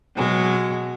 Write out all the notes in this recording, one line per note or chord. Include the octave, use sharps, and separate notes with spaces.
B2 F#3 G#3